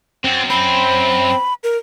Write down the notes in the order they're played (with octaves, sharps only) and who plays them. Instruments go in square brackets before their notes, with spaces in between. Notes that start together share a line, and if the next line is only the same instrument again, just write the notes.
[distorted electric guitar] F#2 [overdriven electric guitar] C4
[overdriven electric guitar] C4 [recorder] B5
[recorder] A#4